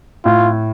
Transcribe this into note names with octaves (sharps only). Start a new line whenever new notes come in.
A2 F4